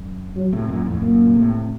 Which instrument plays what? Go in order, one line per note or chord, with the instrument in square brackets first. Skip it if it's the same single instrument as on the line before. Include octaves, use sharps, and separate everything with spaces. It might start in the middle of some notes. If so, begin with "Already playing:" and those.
Already playing: [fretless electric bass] F#2
[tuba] F#3
[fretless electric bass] A2 C3
F#2 A#2
F2 A2
[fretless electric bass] F#2 A#2 [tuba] A#3
[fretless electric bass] A#2
A2 C3